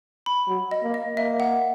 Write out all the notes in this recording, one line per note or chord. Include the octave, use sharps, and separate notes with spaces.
B5
F#3
D#5
A#3
D#5
A#3 E5
F#5